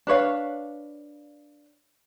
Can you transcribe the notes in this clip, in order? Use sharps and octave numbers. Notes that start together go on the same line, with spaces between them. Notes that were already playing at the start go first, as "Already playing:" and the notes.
D4 B4 C#5 F5